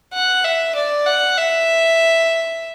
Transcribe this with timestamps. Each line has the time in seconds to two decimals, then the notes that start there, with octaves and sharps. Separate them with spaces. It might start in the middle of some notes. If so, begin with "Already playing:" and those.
0.14 F#5
0.45 E5
0.75 D5
1.06 F#5
1.38 E5